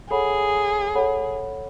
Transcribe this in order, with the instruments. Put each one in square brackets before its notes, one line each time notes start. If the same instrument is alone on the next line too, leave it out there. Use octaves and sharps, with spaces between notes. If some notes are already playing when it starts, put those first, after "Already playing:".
[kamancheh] G#4 [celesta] A4 C#5 F#5 B5
[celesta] A4 C#5 F#5 B5